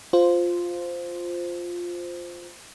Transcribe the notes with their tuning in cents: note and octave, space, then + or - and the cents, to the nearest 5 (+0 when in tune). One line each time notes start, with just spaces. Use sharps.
F4 +5 C5 -5